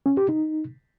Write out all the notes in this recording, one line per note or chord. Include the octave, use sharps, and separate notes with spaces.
C#4
G4
D#4